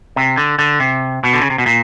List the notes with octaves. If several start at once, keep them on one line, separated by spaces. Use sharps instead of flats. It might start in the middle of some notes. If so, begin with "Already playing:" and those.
C3
D3
D3
C3
B2
D3
C#3
C3
B2
A#2